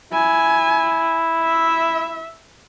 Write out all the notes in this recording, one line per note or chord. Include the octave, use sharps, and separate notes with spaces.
E4 G#5
E5